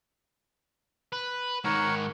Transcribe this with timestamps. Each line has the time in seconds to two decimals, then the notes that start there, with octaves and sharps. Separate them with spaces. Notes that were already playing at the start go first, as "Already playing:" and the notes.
1.13 B4
1.64 G#2 D#3 A#4 C#5 F#5